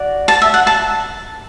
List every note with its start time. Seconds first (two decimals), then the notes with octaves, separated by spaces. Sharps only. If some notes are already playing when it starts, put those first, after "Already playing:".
Already playing: F#4 D5
0.28 A5
0.42 E5
0.54 F#5
0.67 A5